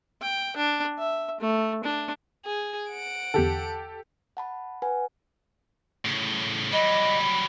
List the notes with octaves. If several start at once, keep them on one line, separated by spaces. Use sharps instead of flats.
G5
D4
E5
A3
D4
G#4
F#5 D7
E2 D3 G4 A4
F#5 A5 B5
B4 F#5 G#5
A2 C#3
F#3 G3 D#5 B5